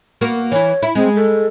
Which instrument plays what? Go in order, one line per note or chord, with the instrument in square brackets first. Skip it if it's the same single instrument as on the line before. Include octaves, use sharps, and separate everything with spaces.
[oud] A#3 B3 F#4
[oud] E3 E4 [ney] C#5
[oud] E4
[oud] G#3 [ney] C4
[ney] A4